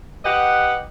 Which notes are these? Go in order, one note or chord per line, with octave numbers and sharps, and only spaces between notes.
G4 B4 D#5 F#5